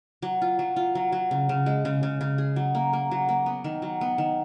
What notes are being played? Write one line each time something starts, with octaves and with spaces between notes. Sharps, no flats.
F#3
F4
F#3
F4
F#3
F#3
C#3
C#3
G#3
C#3
C#3
C#3
G#4
F#3
A#3
A#3
F#3
A#3
B3
D#3
F#3
B3
D#3